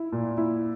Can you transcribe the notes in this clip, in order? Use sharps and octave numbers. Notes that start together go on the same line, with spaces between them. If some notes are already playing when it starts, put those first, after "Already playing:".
Already playing: E4
A#2
E4